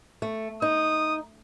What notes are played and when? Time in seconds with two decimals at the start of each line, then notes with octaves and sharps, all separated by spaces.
0.22 A3
0.62 D#4 D#6